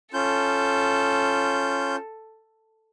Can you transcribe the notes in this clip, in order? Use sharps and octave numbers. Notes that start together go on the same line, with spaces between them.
C#4 F4 A4 G6